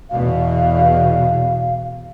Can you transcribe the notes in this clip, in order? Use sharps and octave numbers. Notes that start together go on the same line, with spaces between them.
E2 B2 F5